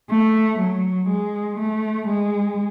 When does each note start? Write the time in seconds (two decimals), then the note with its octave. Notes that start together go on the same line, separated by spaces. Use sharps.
0.10 A3
0.59 F#3
1.09 G#3
1.59 A3
2.08 G#3